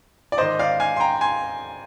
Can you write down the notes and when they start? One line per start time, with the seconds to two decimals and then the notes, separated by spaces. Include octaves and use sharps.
0.32 D5
0.38 G#2 D#3 C5 D#5
0.59 D5 F5
0.80 F5 G#5
0.97 C6
1.00 G5 A#5
1.21 G#5 C6